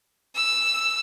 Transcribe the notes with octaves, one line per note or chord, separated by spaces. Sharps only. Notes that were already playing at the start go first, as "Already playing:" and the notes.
E6